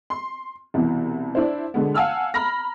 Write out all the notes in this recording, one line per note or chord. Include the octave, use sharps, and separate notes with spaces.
C6
C2 B2 E3
D4 E4 C5
B2 D3 G#3 B3
F5 F#5 G#5 A5 E6 F6
A#5 B5 F6 A#6